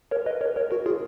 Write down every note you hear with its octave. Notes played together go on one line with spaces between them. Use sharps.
A#4 C#5
B4 D#5
A#4 C#5
A#4 C#5
F#4 A#4
F4 G#4